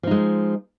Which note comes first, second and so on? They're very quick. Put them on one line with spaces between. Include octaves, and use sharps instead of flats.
F3 D#4 G#3